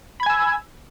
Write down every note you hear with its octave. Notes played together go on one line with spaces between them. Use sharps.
G#5 B5 E6 G#6